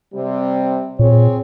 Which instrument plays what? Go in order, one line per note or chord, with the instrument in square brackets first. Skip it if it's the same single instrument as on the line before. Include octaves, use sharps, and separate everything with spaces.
[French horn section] C3 G3
[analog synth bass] A#2 [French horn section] C4 G#4 C#5